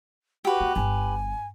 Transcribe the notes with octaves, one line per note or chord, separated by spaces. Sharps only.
F#4 G4 B4
A#3
G1 G#5